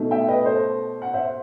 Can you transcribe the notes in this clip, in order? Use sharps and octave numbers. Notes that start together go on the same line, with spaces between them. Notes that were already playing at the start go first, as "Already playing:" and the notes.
Already playing: B2 A3 D#4
E5 G5
B4 D#5
A4 C5
F#5
C5 E5